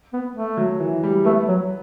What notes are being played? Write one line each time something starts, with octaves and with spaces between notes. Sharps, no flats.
B3
A3
F#3
E3
G3
A3 B3
F#3